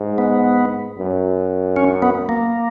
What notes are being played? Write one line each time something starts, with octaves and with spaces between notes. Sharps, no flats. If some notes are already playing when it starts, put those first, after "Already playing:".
Already playing: G#2
B3
F#2
C#4
B3
A#3